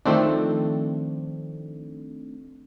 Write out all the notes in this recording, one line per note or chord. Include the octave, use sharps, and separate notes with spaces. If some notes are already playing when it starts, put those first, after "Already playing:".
D#3 F3 A3 C4 D4